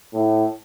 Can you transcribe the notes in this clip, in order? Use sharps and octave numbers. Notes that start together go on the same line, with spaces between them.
A2